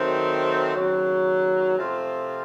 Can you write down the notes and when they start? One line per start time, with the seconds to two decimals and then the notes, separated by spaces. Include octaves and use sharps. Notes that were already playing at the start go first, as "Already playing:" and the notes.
Already playing: D#3 F#3 A3 C4
0.76 D#2 C#3 F#3
1.78 C3 F3 A3 C4 F4